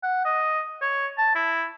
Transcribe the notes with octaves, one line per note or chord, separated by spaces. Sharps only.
F#5
D#5
C#5
A5
E4